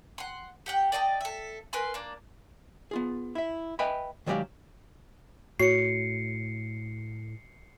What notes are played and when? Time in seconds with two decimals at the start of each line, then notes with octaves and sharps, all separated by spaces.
0.18 F#5 C6
0.66 G4 F#5 G5
0.92 D5 D#5 G5 A5
1.21 A4 E5
1.73 A#4 B4 G#5 C6
1.94 A#3 D4
2.91 B3 F4 G#4
3.35 E4 E5
3.79 B4 D#5 E5 G5 G#5 B5
4.26 D#3 F#3 G#3 G4 D5 F5
5.59 A2 F#4 C#5 C7 C#7